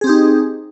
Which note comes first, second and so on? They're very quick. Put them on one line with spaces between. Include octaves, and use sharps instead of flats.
G#4 C4 G4 D#4